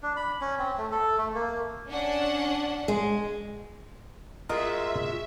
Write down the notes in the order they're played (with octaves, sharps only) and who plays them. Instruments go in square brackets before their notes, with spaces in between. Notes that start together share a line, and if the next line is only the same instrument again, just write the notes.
[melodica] D4
B5
C#4
C4
A3
A4
A3
A#3
[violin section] C#4 D4 F#5
[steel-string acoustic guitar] G#3
[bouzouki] G#3 F4 F#4 [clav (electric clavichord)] A#4 D#5 [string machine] E5